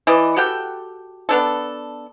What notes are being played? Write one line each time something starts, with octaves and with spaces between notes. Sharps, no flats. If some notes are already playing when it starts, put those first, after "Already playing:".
E3 D5 D#5
F#4 G4 A4 G5
B3 D4 A4